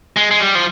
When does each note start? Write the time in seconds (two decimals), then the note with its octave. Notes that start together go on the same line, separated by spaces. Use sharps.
0.17 G#3
0.31 G#3
0.40 G3
0.55 F3